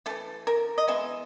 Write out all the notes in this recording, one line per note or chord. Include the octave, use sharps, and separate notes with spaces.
E3 A3 A4
A#4
D#5
E3 G#3 B3 E5